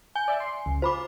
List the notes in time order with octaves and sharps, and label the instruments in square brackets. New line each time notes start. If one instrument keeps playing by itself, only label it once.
[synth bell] G#5 [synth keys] G6
[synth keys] D5 E5
C6
C#2
[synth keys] F4 [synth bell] C5 B5 D6